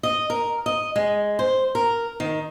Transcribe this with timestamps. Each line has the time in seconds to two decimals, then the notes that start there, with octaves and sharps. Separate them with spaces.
0.03 D#5
0.30 A#4
0.66 D#5
0.96 G#3
1.39 C5
1.75 A#4
2.20 D#3